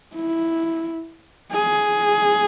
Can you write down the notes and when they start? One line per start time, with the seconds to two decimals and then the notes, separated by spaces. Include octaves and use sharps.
0.16 E4
1.52 G#4